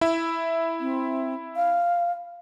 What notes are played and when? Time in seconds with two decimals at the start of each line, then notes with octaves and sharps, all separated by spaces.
0.01 E4 E5
0.80 C4
1.56 F5